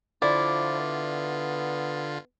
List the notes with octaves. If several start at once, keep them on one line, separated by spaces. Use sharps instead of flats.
D3 F3 E4 F4 D5
B3